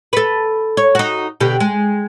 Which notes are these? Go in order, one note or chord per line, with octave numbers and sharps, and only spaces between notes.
A4 B4
C#5
D#4 F#4
B2 D3 G4
G#3